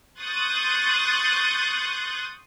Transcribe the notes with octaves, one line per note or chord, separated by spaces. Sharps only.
C6 C#6 D#6 F#6 G6 A6